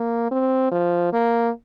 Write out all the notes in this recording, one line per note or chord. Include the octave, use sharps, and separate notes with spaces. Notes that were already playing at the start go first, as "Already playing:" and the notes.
Already playing: A#3
C4
F3
A#3